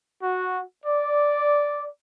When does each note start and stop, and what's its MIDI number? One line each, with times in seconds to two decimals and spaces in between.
0.23 0.60 66
0.85 1.87 74